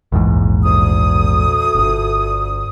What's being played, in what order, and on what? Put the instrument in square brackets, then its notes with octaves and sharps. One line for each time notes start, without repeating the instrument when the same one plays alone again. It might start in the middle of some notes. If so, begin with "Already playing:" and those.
[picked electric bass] A#1 E2 G#2
[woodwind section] D2 D#6
[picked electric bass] D1 G1